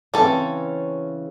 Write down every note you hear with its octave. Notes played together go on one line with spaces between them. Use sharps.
C#3 E3 C4 C#4 A4